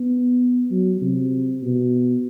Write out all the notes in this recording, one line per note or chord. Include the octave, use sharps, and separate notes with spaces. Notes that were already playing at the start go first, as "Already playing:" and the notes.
Already playing: B3
F#3
C3
B2